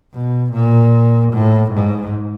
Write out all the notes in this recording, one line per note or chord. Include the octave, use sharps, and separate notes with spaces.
B2
A#2
A2
G#2